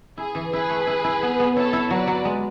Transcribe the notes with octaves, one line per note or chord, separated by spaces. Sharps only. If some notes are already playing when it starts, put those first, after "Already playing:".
E4 G#4
E3
E4 G#4 B4
A3
E4
E4
B3
B3
E4 A4 C#5
E4
F#3 B4 D5
F#3
G#3